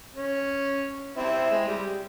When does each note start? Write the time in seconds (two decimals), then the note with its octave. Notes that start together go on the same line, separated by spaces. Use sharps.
0.15 C#4
1.17 C4 E4
1.50 G#3
1.67 G3